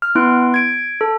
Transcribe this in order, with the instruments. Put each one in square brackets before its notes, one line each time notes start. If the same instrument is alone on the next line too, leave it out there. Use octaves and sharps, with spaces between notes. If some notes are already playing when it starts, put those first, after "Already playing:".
[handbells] F6
B3 E4 C6 F#6 D7
G#6 D7
A4